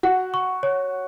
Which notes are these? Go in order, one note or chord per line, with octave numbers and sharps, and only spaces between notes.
F#4 F#5
C#6
C#5